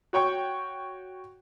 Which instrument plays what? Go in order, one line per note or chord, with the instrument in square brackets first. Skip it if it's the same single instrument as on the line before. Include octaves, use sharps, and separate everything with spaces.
[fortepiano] F#4 C#5 G5 C#6